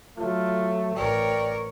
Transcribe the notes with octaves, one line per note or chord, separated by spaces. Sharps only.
F#3 A3 F4
A1 A#4 C#5 D5 G5